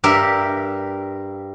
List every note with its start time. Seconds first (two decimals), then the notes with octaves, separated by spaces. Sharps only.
0.04 G2 G4 A#4 E5